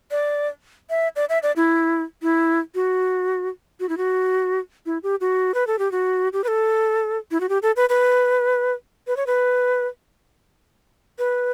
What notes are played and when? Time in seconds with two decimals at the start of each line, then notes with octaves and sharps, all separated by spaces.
0.11 D5
0.90 E5
1.16 D5
1.29 E5
1.43 D5
1.56 E4
2.22 E4
2.75 F#4
3.80 F#4
3.89 E4
3.97 F#4
4.86 E4
5.03 G4
5.21 F#4
5.54 B4
5.67 A4
5.79 G4
5.92 F#4
6.33 G4
6.44 B4
6.48 A4
7.31 E4
7.41 F#4
7.49 G4
7.62 A4
7.76 B4
7.89 B4
9.07 B4
9.17 C#5
9.27 B4
11.19 B4